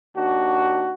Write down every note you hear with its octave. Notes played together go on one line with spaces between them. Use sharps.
D#2 D4 F#4